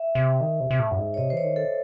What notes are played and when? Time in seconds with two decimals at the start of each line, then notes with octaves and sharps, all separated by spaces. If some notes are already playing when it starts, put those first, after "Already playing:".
Already playing: E5
0.15 C3
0.41 D#3
0.60 C3
0.71 C3
0.79 A2
0.91 F#2
0.98 G#2
1.14 C#5
1.17 C3 D#5
1.30 C5
1.33 E3 C#5
1.43 D#3
1.56 A4